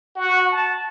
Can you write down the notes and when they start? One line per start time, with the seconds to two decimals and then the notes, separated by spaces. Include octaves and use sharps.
0.16 F#4
0.52 A5